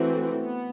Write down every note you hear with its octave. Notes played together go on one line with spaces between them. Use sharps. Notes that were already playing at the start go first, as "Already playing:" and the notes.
Already playing: E3 A3 C4 F#4
B3